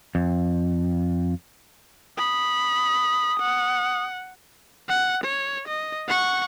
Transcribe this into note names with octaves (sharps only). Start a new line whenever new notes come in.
F2
B5 D#6
F#5
F#5
C#5
D#5
F#5 C#6